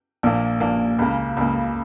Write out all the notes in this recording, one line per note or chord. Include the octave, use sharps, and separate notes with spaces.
A#1 A#2 A#3
A#1 A#2 A#3
C#2 C#3 A#3
C#2 C#3 A#3